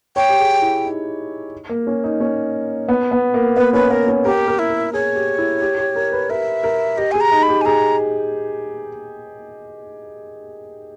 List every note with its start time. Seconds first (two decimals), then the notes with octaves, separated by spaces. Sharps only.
0.16 C#5 G5
0.29 G4
0.39 G#4
0.62 E4
0.84 D#4
1.69 A#3
1.87 C#4
2.04 D#4
2.20 C#4
2.89 B3
3.11 B3
3.34 A#3
3.57 B3 B4
3.73 C#4 B4
3.84 A#3
3.91 B3 A#4
4.08 C#4
4.25 G4 A#4
4.48 A#4
4.59 E4
4.70 A#4
4.93 G#4 C#5
5.16 G4
5.38 E4
5.62 G4
5.78 G4
5.95 A#4
6.12 B4
6.29 A#4 E5
6.64 A#4
6.97 G4 D#5
7.11 G#4 G#5
7.20 A#5
7.32 D#4
7.43 B5
7.49 G4
7.61 G#5
7.66 G#4 A#5